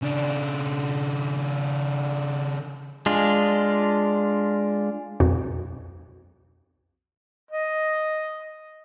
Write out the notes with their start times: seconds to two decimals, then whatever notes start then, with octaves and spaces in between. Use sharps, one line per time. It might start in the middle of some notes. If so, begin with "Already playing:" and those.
0.02 C#3 D4
3.06 G#3 D4 F4
5.20 B1 F2 F#4
7.51 D#5